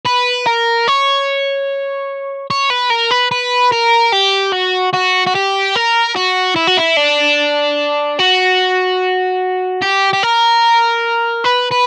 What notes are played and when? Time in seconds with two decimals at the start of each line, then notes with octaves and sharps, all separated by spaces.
0.06 B4
0.47 A#4
0.88 C#5
2.50 C#5
2.70 B4
2.90 A#4
3.11 B4
3.31 B4
3.72 A#4
4.13 G4
4.52 F#4
4.93 F#4
5.27 F#4
5.35 G4
5.76 A#4
6.16 F#4
6.56 E4
6.67 F#4
6.77 E4
6.97 D4
8.19 F#4
9.82 G4
10.13 G4
10.23 A#4
11.44 B4
11.71 B4